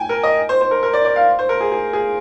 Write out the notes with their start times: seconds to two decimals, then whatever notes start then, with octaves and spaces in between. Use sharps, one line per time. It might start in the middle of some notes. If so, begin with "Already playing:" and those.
Already playing: G5 G#5
0.09 A#4
0.24 D#5
0.49 C5
0.61 C5
0.71 A#4
0.83 A#4
0.94 D5
1.05 D5
1.16 F5
1.39 C5
1.49 A#4
1.61 G#4
1.72 G#4
1.93 G#4